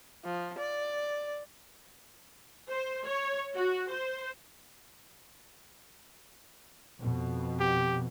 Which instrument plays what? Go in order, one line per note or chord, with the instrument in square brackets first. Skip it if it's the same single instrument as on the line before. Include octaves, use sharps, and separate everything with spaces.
[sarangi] F3
D5
[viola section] C5
C#5
F#4
C5
[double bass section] F2 B2
[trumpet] G4